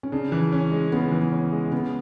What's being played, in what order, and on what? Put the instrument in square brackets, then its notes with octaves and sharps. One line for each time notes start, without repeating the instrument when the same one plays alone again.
[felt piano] C#4
[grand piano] C#3 [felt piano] D4
[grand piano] E3
C#4
G#3
[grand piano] C#3 [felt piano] B3
[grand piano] E3
C#4
G#3
[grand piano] C#3 [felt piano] B3